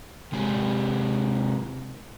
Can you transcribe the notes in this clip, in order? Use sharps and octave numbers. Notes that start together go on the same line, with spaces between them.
C3 G#3 C4 G4